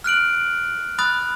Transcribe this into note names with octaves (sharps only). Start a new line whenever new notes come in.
F6 F#6 D7 F#7
B5 D#6 F#6 A6